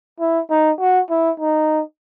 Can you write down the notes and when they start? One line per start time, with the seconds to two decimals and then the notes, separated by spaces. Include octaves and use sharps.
0.20 E4
0.50 D#4
0.80 F#4
1.10 E4
1.40 D#4